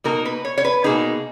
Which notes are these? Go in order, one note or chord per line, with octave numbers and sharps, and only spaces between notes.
B2 A#3 D#4 A#4
B4
C#5
C#5
B4
B2 A#3 D#4 G#4